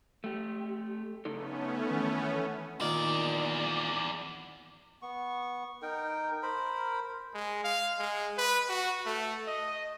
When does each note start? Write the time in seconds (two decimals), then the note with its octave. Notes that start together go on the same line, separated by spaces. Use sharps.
0.24 A3 G4
1.25 C#3 A3 B3 C#4 D#4 A4
1.90 D#3 E3
2.80 E2 A#2 D#3 D5
5.02 B3 C#6
5.82 D#4 A#4 G5
6.43 A#4 C5 B5
7.34 G#3
7.64 F5
7.99 G#3
8.37 B4
8.69 F#4
9.06 A3
9.48 D#5